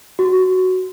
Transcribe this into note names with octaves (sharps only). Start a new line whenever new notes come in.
F#4